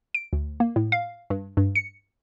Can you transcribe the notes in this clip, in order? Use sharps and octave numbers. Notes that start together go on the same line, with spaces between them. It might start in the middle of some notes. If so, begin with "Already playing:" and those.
D7
D2
A#3
A2
F5
G2
G2
C#7